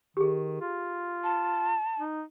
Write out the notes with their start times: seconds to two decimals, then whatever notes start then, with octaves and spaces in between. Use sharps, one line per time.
0.17 D#3 G4 G#4
0.61 F4
1.24 A5
1.99 D#4